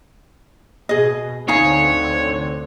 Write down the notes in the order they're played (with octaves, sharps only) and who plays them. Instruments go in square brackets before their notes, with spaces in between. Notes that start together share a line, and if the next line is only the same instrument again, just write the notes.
[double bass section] B2 [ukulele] G#4 D#5
[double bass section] D2 D3 C4 [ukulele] D#4 F5 G#5 [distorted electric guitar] C#5